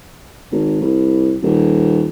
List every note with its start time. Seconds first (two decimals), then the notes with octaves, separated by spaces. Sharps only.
0.52 G#1
0.81 C2
1.42 D#1